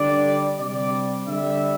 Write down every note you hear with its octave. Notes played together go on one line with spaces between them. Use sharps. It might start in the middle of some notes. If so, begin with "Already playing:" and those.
Already playing: D3 G3 D5
C3 G3 D5
D3 G3 E5